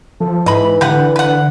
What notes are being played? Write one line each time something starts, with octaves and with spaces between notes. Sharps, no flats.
F3 A4
G#2 E3 D#5 B5
D3 G4 B4 F#5
B4 F#5